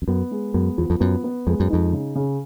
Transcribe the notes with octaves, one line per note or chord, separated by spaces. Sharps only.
F2
F#2 B3
G#3
F#2 B3
E2 F3
F2
F#2 B3
B3
F2 G#3
F#2
F2 D#4
C#3
C#3